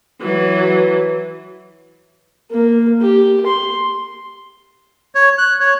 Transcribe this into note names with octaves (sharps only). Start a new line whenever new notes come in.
E3 F#3
A#3
G4
C6
C#5
F#6
C#5